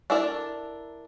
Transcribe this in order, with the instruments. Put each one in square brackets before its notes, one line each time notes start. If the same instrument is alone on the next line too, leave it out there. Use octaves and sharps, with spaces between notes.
[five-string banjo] D4 E4 A4 A#4 D5